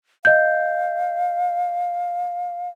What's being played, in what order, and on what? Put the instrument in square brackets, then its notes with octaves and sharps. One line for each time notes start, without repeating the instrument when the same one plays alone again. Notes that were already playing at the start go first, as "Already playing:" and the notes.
[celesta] D#5 G6 [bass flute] F5